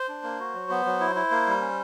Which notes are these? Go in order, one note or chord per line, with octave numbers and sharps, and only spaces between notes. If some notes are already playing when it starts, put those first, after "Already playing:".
Already playing: C5
D4
A#3
F#4
F#3
B3
F#3
E4
E4
A#3
G3
C#4